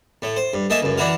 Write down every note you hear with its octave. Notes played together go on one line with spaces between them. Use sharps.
A2 A3
C5
G2
A3 A#3 D#5 E5 G#5 A5
C#2 F#2
E3 D4 E4 F#4 A#4